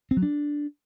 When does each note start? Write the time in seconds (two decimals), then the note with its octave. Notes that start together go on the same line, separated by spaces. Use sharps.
0.11 C4
0.17 F#3
0.23 D4